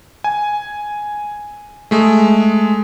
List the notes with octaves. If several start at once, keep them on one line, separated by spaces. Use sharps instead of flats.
G#5
G#3 A3